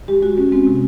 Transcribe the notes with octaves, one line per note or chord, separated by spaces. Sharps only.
G#3 G4
G#3 F#4
G#3 C#4
G#3 C4
C3